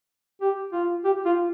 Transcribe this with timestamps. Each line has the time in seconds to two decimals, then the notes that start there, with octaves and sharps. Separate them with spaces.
0.41 G4
0.72 F4
1.04 G4
1.25 F4